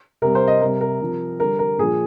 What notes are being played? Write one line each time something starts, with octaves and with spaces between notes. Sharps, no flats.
C3 G3 A#4
C5
D#5
C3 G3 A#4
A#4
C3 F3
D3 G3 A#4
A#4
A#2 F3 G#4